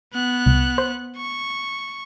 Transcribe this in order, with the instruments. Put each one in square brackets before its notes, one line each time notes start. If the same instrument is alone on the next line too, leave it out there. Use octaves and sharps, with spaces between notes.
[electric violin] B3 F#6
[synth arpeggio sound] C2
C5
[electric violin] C#6